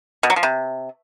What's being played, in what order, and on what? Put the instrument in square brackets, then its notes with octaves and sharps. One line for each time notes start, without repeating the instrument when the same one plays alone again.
[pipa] B2
F#3
F3
C3